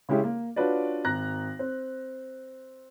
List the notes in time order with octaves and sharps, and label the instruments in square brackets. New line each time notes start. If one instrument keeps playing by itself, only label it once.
[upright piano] C#3 G#3 C#4 E4 G4 G#4
A#3
D4 F4 F#4 B4 C#5 D5
G#1 A#5 F#6 A#6
C4